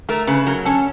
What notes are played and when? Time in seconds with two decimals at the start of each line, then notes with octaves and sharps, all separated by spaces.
0.09 A3 A#4
0.27 C#3 B4
0.46 F#3 A#4
0.65 C#4 A4